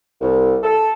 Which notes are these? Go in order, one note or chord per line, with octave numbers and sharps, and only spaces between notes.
C2
A4